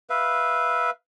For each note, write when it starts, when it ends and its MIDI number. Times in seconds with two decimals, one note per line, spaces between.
0.10 0.90 71
0.10 0.90 76
0.10 0.90 77